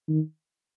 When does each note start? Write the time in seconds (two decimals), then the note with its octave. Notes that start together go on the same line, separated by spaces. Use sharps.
0.08 D#3